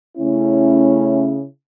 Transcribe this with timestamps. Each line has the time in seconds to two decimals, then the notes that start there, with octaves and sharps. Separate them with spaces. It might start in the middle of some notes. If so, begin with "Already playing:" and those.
0.16 C#3 A3 C#4 E4